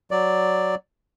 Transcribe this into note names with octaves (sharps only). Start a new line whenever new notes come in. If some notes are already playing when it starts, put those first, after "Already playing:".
F#3 D5